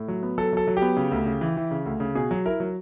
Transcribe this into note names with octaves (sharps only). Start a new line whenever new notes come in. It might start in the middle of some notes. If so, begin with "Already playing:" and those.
Already playing: A2
F#3
B3
F#3 A4
F#3 A4
F#3
G4
B3
C#3
D2
C#3
E3
E3
C#3
D2
C#3
B2 G#4
F#3
E4 A#4
F#3